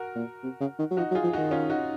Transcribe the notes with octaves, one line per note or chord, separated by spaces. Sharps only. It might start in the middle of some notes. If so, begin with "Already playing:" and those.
Already playing: F#4 A#4
A#2
C3
C#3
D#3
F#3
F3 D#4 F#4
F#3
F4 G#4
F3
D#3 D#4 F#4
C#4 F4
D#4 F#4